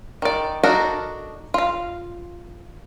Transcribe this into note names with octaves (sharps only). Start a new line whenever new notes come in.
D#3 D5
D4 D#4 F#4 A4 A#4
F4 F5